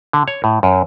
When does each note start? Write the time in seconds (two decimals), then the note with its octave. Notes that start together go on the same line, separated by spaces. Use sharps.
0.13 D3
0.28 C#5
0.44 A2
0.63 F#2